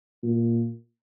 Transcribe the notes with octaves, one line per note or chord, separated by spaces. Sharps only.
A#2